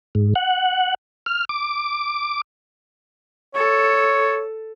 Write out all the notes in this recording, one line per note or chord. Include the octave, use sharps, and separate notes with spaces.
G#2
F#5
F6
D6
A4 C#5